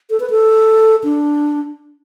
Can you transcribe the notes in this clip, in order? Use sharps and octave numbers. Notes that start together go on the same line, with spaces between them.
A4
B4
A4
D4